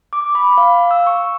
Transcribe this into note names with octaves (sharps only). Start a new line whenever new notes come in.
D6
B5
F5
E6
C#6